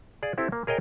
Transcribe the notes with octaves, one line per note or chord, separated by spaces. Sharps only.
G#4 D5 F5
C4 E4 G4 A4
A#3
G#4 A#4 C#5 D#5 G5 G#5